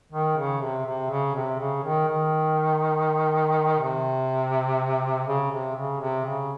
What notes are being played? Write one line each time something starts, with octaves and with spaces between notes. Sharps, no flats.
D#3
C#3
C3
C3
C#3
C3
C#3
D#3
D#3
C3
C#3
C3
C#3
C3
C#3